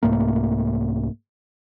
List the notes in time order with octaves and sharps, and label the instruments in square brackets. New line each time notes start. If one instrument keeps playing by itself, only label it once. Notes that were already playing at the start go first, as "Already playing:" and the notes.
[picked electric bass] C2 G#2 A3 A#3